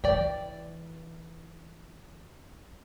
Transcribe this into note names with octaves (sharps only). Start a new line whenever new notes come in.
E3 D5 G5